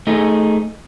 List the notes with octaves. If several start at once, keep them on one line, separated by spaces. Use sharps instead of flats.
A3 D#4 G#4